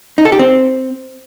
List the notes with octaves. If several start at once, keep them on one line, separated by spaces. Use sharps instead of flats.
D#4
A4
G4
C4